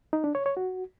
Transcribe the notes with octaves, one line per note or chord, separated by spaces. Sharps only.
D#4
D4
C#5
C#5
F#4